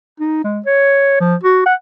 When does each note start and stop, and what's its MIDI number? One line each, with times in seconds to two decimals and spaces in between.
0.20 0.44 63
0.44 0.60 56
0.66 1.17 73
1.20 1.35 53
1.44 1.65 66
1.66 1.74 78